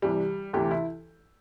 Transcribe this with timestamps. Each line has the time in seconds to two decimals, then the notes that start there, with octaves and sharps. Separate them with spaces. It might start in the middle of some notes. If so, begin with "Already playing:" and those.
0.02 C2 C3 E3 G3
0.53 D2 C3 E3 G4
0.71 E4